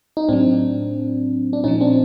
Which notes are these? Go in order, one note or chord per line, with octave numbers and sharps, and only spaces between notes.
D#4
A2 F#3 C4 D4
D4
A#2 F3 C#4 D#4
C4 D4